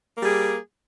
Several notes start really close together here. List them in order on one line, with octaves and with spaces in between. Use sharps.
A#3 G3 G#4